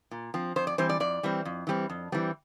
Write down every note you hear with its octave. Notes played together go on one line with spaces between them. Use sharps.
A#2
F3 C4
F2 C5
D5
E3 G3 C4 C5
D5
F2 D5
E3 G3 C4
F2
E3 G3 C4
F2
E3 G3 C4